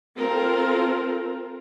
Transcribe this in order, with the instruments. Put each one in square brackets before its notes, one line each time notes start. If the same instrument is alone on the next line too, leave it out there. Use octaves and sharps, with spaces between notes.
[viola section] C4 F4 A4 A#4